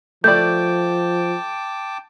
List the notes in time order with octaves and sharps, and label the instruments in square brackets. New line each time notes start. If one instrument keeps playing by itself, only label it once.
[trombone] F3 [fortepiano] A3 D5 [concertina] G5 A5 D6 [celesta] G6